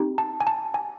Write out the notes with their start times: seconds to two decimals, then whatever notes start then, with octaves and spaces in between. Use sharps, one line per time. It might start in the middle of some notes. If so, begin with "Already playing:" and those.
Already playing: C4 D#4 G4
0.18 A5
0.40 G#5
0.47 A5
0.74 G#5